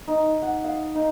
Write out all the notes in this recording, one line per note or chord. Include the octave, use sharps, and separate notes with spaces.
D#4
F#5
F5
D#4